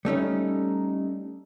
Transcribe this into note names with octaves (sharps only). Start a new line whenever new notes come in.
G3 A3 C#4 D#4